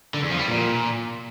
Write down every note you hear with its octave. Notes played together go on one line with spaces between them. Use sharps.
D3
E2
F3
G3
A#2